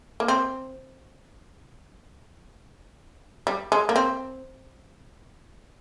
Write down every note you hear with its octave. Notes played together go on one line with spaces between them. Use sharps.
A#3
C4
G3
G#3
A#3
C4